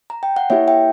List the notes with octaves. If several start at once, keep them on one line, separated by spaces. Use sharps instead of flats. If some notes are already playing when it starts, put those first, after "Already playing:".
A#5
G5
F#5
A#3 E4 G4 C#5 E5
E5 G5